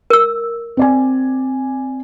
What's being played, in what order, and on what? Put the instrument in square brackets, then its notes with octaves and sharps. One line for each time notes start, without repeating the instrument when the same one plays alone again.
[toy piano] A#4 E6
[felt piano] C4 D5 G#5